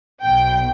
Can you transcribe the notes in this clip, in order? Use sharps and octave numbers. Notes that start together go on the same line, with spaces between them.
B1 B2 G5